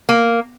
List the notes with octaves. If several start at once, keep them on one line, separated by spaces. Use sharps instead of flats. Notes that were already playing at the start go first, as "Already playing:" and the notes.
A#3